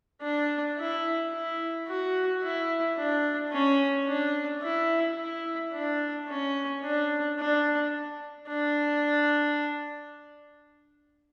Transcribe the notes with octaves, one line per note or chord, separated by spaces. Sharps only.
D4
E4
E4
F#4
E4
D4
C#4
D4
E4
E4
D4
C#4
D4
D4
D4